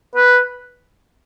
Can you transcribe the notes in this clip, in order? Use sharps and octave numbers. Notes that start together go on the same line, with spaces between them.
B4